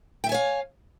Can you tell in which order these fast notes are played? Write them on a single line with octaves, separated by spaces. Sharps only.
G5 E5 G#5 C#5 F5